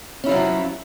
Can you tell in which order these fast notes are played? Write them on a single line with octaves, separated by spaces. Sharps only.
C#4 E4 F3 F#3